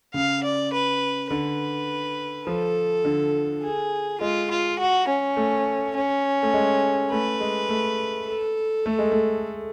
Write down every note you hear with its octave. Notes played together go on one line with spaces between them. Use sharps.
C#3 F5
D5
B4
D3 B4
F3 A4
D3
G#4
G#3 F4
F4
F#4
C#4
A3
C#4
A3
G#3
A3 B4
G#3
A3
A4
A3
G#3
A3